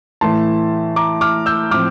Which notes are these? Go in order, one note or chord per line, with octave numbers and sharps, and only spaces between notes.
A2 E3 A3 A5 C6
A#5 D6
D6 F6
E6 G6
A2 F3 C4 D6 F6